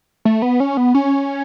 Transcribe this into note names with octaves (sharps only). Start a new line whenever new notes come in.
A3
B3
C#4
B3
C#4